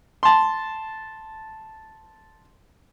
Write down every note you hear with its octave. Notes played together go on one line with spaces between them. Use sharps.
A5 C6